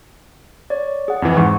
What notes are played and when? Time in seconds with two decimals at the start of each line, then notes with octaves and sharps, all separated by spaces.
0.70 C#5 D5
1.08 G#4 F#5
1.22 F2 E3
1.37 G#2 C#6